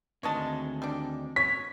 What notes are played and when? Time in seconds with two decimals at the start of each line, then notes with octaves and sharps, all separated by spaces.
0.23 D2 D#3 G#3 C4 C#5 D#5 A5
0.82 G3 D4
1.36 C#5 B6